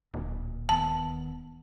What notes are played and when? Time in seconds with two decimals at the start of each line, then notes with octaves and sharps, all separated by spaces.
0.14 D1 A#2
0.69 D#2 D#3 B3 A5